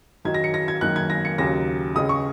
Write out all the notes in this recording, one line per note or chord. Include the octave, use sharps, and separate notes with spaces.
F#2 D#3 F#3 D#4 G#6
A#6
C#7
A#6
G#6
F#2 D#3 A#3 F#6
G#6
A#6
C#7
D#2 C#3 F#3 A#6
C#2 C#3 G#3 C#4 D#6
C#6